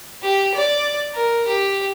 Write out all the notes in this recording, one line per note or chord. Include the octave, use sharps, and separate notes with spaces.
G4
D5
A#4
G4